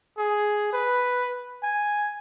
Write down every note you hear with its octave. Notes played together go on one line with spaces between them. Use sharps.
G#4
B4
G#5